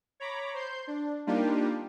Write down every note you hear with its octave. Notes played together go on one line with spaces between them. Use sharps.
C#5 A#5 B5 D6
C5 C6 G6
D4
G3 A#3 D4 D#4 F4 G4